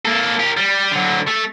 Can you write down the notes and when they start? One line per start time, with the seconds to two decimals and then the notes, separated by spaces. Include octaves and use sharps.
0.05 A#3 A4
0.39 G4 A#4
0.57 G3
0.92 D3 F#3
1.28 A3